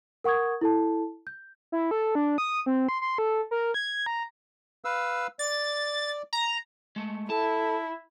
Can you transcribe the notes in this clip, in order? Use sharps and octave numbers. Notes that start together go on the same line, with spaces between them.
A#4 F#5 C#6 D#6 G#6
E4 A4 A5
G6
E4
A4
D4
D#6
C4
C6
C6
A4
A#4
G#6
A#5
B4 F5 E6
D5 A6
A#5
G#3 A3
E4 A4 A5